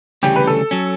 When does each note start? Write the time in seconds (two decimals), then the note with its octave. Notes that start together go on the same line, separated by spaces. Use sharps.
0.23 D2 C#3 E3 G3 C#4 G4
0.36 B4
0.47 A4
0.71 F#3 C#4